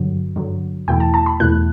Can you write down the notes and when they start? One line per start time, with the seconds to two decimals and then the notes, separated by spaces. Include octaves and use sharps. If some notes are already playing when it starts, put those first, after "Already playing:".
Already playing: G2 D3 F#3
0.36 G2 D3 F#3
0.88 E2 B2 A3 E4 G5
1.00 A5
1.14 A5
1.26 B5
1.40 E2 B2 A3 E4 F#6